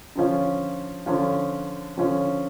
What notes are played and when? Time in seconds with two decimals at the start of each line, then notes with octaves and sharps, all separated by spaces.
0.16 D3 F3 C#4 F4
1.06 D3 F3 C#4 F4
1.98 D3 F3 C#4 F4